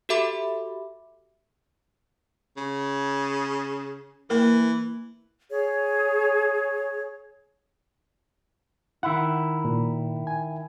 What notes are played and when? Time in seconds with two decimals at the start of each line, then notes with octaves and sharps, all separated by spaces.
0.09 F#4 G4 A4 E5 B5 D6
2.57 C#3
4.30 E3 A#3 A#4
5.51 G#4 C#5
9.03 D#3 E4 F#5
9.65 A#2
10.27 G#5